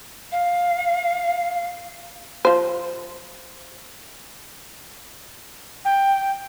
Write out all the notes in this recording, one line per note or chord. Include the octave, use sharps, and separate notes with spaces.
F5
F3 C5
G5